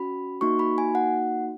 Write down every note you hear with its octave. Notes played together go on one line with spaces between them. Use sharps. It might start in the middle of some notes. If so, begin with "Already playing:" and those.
Already playing: C#4 F#4 B5
A#3 D#4 F#4 C#6
B5
G#5
F#5